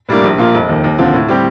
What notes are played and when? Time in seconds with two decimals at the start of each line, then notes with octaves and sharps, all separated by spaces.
0.09 A2 G3 A#3 D4
0.24 A#1
0.38 A#2 F3 A#3 F4
0.54 F1
0.69 D#2 D#3
0.84 D#2
0.98 D3 F3 C4 F4
1.14 A2
1.28 G3 C4 G4